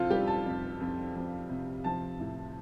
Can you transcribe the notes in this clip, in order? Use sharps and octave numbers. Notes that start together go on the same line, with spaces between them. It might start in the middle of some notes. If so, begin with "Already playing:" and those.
Already playing: F2 C3 F4 A4 C5
G3 G4
A5
F2
F2
F2
C3
F3 A5
A2